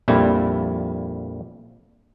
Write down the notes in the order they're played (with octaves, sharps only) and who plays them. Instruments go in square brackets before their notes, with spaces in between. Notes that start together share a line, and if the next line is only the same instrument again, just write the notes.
[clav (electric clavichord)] A#1 F2 A#2 G3 E4